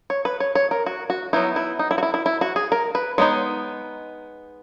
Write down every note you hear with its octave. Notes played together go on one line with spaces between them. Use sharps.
C#5
B4
C#5
C#5
A#4
F#4
F#4
F#3 B3 D#4 E4
E4
D#4
E4
F#4
E4
E4
E4
F#4
G#4
A#4
B4
G#3 B3 D#4 C#5